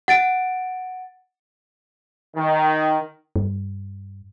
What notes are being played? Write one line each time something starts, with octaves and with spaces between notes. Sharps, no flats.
F#5 A6 D7
D#3
G2